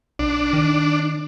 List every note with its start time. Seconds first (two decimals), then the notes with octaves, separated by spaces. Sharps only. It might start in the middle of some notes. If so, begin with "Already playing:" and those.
0.19 B1 D4
0.53 D#3